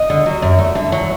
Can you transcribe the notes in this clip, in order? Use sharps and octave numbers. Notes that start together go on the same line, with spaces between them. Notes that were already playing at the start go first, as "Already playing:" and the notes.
Already playing: D#5
D3
F#3
F#2
A3
D3
F#3